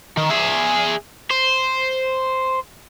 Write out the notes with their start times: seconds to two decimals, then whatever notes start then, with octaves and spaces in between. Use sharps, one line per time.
0.17 D#3
0.30 G#4 E5
1.30 C5